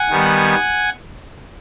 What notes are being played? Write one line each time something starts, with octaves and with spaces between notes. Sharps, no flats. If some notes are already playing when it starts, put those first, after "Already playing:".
Already playing: F#5 G#5
D#3 G3 B3